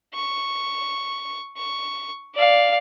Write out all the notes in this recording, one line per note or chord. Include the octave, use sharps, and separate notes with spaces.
C#6
C#6
D5 F5